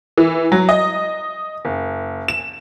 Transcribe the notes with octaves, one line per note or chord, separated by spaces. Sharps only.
E3
F#3
D#5
F#1
E7